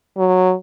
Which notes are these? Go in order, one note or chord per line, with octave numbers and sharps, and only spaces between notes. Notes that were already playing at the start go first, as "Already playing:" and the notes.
F#3